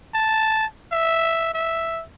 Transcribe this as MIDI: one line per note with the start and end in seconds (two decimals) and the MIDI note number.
0.14 0.65 81
0.92 1.50 76
1.54 2.02 76